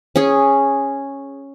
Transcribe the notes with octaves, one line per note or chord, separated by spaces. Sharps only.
C#4 G#4